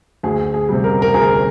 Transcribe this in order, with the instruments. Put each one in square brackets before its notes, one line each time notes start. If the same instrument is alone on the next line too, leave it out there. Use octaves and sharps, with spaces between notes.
[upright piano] D2 G#4
G#4
C3 G3
A#4
A#4
D2 G#4